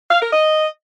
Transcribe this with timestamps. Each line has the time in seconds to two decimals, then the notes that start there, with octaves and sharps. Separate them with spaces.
0.11 F5
0.22 A#4
0.33 D#5